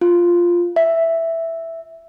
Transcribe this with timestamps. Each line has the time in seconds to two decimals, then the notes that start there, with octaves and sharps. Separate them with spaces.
0.01 F4
0.76 E5